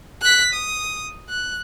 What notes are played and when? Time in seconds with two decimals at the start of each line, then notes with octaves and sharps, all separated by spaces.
0.21 F#6 B6
0.54 D#6
1.29 F#6